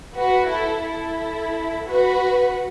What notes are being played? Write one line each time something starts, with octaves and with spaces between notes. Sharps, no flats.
F#4 B4
E4 A4
E4 A4
F#4 B4